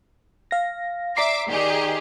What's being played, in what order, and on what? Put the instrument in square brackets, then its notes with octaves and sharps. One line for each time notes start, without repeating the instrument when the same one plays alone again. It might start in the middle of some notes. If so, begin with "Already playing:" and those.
[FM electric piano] F5 A#6
[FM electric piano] D5 A#5 C7 [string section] E5 D6
[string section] D#3 G4 G#4